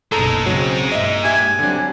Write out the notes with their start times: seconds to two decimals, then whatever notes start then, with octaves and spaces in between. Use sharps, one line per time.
0.12 F#1 B1 G#3 D#4 A4 A#5
0.46 C#3 F#3 C4
0.92 G2 A#2 D#5 E5
1.24 G4 E5 G#5
1.59 D3 F#3 G3 C4 D4